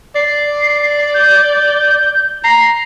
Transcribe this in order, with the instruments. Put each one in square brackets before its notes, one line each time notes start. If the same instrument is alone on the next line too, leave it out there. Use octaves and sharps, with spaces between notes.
[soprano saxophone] D5 [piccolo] C7
[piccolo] G6
[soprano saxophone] A#5 [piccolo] C7